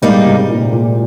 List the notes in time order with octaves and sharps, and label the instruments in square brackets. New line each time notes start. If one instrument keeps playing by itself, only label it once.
[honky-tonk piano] G#2 [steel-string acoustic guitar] G3 A#3 D#4
[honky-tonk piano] G#2 C3
A#2
A#2